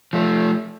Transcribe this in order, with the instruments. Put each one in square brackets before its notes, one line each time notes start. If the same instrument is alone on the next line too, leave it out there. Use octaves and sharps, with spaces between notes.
[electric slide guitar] F3 A3